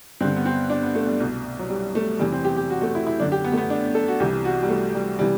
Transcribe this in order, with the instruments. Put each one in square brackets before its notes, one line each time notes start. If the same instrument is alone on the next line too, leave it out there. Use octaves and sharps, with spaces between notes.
[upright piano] G2 C4
D3
B3
C4
D4
B3
A3
G3
C2 B2
F#3
G3
A3
E2 C3 E3 G3
C4
G4
G4
F#4
A3
E4
E4
F#2 D3 D4
G4
B3
A3
B3
D4
A4
F#4
C2 C3 E3 G4
F#4
G3
A3
G3
C3 E3 G3